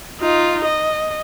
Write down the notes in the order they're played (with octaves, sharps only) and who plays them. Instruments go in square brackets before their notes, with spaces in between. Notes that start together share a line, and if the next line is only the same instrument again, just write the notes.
[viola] D#4 F4
D#5